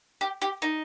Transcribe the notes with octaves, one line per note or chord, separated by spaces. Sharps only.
G4
G4
D#4